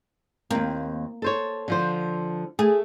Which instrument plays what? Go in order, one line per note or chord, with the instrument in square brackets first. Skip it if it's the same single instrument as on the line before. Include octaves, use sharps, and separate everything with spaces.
[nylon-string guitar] D#2 C4 [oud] A#3
[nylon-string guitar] A4 C5 C#5
D3 F3 C5
[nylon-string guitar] A3 [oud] G#4